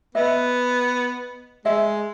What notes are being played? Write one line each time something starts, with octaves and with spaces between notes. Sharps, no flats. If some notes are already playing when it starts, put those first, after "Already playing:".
B3 D#5 E5
G#3 D#5 E5